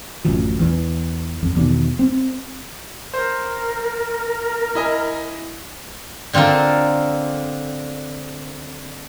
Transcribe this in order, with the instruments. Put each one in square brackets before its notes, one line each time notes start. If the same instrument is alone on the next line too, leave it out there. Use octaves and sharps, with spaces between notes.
[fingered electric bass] D1 A1 F#2 F3
E2 E3
F2
E2 B2 D#3
C4
[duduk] A#4 [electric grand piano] C5
[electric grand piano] E4 D#5 G#5
[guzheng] D3 C4 F4 A4 A#4